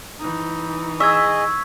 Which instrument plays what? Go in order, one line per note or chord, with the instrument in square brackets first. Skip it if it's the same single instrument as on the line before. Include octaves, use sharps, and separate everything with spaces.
[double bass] E3 D#4
[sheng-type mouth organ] G#4 D#5 [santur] E5 [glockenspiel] C#6 E6 G#6